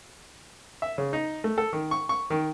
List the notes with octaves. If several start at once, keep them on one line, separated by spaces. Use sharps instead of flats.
E5
C#3
D#4
A3
A4
D#3
C#6
C#6
D#3